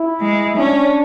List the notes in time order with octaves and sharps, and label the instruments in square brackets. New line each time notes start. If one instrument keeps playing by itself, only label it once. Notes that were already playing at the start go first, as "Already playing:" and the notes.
Already playing: [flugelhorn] E4
[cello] G#3
[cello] C#4 [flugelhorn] D4